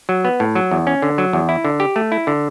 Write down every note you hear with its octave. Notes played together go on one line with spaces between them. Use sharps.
F#3
B3
A2
F#3
E2
C#4
D3
F#3
E2
E4
D3
G4
A3
E4
D3